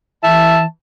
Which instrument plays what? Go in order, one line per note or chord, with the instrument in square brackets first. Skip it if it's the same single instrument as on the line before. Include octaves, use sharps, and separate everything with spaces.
[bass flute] E3 [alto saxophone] E5 [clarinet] A5